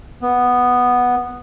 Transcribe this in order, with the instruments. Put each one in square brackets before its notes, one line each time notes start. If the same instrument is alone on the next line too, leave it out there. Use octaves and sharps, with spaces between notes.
[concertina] B3